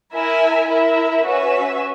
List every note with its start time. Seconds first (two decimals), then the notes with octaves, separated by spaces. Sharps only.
0.13 E4 A#4 E5 G#5
0.69 E4 A#4 E5
1.25 C#4 F#4 B4 E5